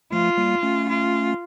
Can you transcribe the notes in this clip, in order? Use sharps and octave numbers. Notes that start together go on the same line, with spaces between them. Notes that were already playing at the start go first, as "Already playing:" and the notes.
F3 A3 F4
G3 A#3
A3 C#4
F4